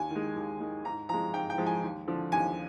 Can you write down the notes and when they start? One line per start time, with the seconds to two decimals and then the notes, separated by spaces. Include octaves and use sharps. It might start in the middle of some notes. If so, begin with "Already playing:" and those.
Already playing: D#2 G#5
0.11 D#3 G#3
0.36 D#2
0.60 D#3 G#3
0.84 G#2 A#5
1.09 F3 G#3 A#5
1.34 G#2 G5
1.50 G5
1.58 F3 G#3
1.66 G#5
1.83 D#2
2.07 D3 F3
2.32 D#2 G#5